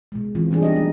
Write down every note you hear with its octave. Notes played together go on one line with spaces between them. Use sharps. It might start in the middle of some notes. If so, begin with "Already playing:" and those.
B2 G#3
B2 E3 C4 F4
E3 G3 D4 G#4
B3 D#4 G4 D#5
F#3 A3